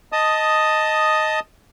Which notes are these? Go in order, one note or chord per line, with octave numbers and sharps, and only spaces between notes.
D#5 A5 D#6